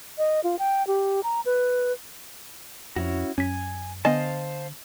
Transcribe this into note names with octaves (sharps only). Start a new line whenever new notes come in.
D#5
F4
G5
G4
A#5
B4
F2 C#4 E4 F#4
F#2 C#4 G#5 B6
D3 B3 C5 D#5 F5 G#5 A5